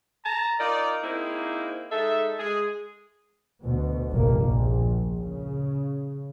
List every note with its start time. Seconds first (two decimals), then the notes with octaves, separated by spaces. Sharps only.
0.25 A5 A#5
0.60 D#4 F4 A#4 D5
1.03 A#3 C4 D#4 E4 G#4
1.91 G#3 D#4 A4 E5
2.38 G#3 G#4
3.62 D2 B2
4.11 F1 A#1 G2 A#3
4.41 A#1
5.20 C#3